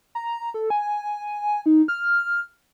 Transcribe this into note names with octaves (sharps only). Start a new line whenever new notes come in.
A#5
A4
G#5
D#4
F6